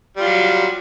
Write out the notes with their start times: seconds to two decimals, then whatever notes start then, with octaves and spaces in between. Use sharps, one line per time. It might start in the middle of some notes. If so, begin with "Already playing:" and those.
0.17 G3
0.21 F4
0.24 F#3